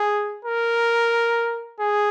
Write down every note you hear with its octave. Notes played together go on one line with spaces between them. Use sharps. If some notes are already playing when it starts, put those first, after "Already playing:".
Already playing: G#4
A#4
G#4